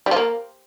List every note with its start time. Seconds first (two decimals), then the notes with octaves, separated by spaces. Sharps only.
0.06 G3
0.11 F3
0.16 A#3